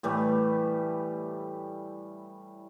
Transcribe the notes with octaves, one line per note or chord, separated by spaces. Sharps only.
A2 E3 G3 A3